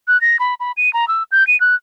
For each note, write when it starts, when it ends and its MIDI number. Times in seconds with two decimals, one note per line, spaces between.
0.08 0.20 90
0.21 0.37 94
0.39 0.54 83
0.60 0.72 83
0.77 0.92 99
0.93 1.08 82
1.08 1.23 88
1.32 1.46 91
1.47 1.59 99
1.60 1.75 90